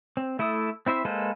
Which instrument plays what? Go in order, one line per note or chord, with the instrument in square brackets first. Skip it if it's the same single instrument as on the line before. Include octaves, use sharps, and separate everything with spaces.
[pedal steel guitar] C4
A3 E4 A4 D#6
C4 E4 C5 E5
G#3 A#3 A4 B4 C5